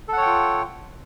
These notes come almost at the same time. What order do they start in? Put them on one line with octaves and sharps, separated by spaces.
A4 F#5 C#5 G5 F4